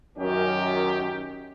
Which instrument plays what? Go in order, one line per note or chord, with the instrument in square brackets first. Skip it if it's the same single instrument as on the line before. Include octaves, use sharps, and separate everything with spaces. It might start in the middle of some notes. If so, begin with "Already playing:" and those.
[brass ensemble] F#2 D#3 C#4 G4